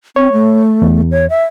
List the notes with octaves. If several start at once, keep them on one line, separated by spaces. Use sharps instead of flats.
C4 C#5
A3
E2
C#5
E5